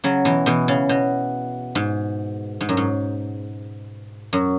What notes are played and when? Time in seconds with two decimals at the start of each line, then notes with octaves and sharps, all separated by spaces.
0.04 C#3 F#3
0.25 B2 E3
0.46 B2 E3
0.68 C#3
0.89 B2
1.75 G#2
2.61 G#2
2.69 F#2
2.77 G#2
4.33 F#2